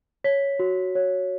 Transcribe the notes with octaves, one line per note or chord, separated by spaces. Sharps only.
C#5 B6
F#4
C#5